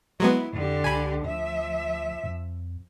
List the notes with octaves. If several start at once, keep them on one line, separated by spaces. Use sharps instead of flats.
F#3 G#3 B3 E4
F2 D3 G4
C#2 G#5 B5
D2 F3 E5
F2